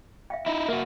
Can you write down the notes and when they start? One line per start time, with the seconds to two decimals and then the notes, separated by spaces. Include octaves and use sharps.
0.30 E5 F5 G5
0.46 D#4 E4 E5
0.69 A#3 F#4 A#4 E5